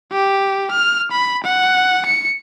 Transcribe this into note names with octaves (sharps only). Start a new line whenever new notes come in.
G4
F6
B5
F#5
C#7